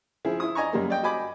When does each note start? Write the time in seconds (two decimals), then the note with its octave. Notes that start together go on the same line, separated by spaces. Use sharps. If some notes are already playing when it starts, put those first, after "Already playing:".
0.25 F3 E4 G#4
0.40 E4 D#6
0.55 D5 D#5 G#5 A#5 C#6
0.73 F#2 G3 A#3
0.90 D5 D#5 G5
1.03 F#4 D#5 G#5 B5 D6